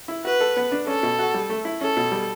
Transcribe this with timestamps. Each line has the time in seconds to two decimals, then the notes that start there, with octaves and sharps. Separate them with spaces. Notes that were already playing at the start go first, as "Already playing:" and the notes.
0.08 E4
0.24 F#4 B4
0.40 A4
0.56 B3
0.72 D4
0.87 C#4 A4
1.03 B2
1.19 F#4
1.34 G3
1.50 A3
1.65 E4
1.81 C#4 A4
1.97 B2
2.12 G3